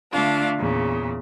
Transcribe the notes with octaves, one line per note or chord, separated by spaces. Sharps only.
D3 A3 D4 F4 F5
E2 A#2 C#3